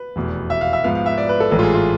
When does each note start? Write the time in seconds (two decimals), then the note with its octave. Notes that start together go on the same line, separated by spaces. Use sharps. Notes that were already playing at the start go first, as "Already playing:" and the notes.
Already playing: B4
0.16 F1 E2 B2
0.50 E5
0.61 F5
0.73 E5
0.84 G#2 F3 B3 F5
0.95 F5
1.06 E5
1.18 D5
1.29 B4
1.40 A4
1.51 A1 G#2 E3 A4
1.59 F4
1.63 G#4
1.74 F4